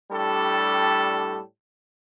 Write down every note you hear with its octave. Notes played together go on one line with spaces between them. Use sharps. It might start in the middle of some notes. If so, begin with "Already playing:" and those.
A2 G3 D4 G4 A4